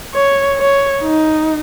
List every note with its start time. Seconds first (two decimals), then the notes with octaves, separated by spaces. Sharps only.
0.14 C#5
0.58 C#5
1.03 D#4